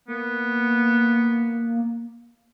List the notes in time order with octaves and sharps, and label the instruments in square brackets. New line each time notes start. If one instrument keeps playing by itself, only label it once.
[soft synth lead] A#3 [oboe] B3